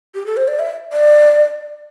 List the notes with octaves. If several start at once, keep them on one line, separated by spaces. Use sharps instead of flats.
G4
A4
C5
D5
E5
D5